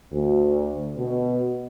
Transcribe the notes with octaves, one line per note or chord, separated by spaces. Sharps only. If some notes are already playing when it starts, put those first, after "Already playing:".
D2
B2